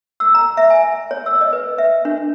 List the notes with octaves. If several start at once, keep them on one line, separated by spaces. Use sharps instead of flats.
E6
A#5
E5
G#5
C#5
E6
D#5
B4
E5
D4